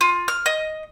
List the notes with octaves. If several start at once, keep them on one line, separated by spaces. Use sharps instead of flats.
F4
F6
D#5